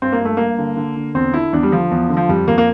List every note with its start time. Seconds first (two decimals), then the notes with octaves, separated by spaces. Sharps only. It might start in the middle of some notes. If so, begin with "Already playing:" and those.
0.02 G2 C4
0.12 A#3
0.20 G2 A3
0.37 G2 A#3
0.58 D3
0.77 D3
0.96 D3
1.14 E2 C4
1.34 D3 E4
1.53 E2 D4
1.63 G3
1.72 D3 F3
1.91 E2
2.09 D3
2.17 F3
2.29 F2 G3
2.47 F2 A#3
2.58 A#3